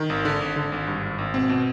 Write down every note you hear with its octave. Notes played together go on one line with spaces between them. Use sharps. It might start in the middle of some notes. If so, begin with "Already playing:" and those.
Already playing: D#3
G#1
D3
G#1
D3
G#1
G2
G#1
G#1
B2 C4
B2